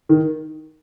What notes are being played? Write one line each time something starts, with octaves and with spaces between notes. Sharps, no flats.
D#3